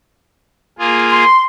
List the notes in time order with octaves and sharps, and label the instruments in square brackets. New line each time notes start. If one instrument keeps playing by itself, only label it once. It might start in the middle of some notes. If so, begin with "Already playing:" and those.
[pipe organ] A#3 F4 G#4
[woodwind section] C6